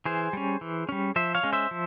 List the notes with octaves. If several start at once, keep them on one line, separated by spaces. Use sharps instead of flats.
E3 G#4 C5
G3 C#4
E3
G3 C#4
F3 C5 E5
C#5 F5
G#3 C#4
C5 E5
F3